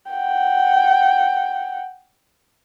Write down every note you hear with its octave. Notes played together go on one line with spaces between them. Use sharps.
F#5 G5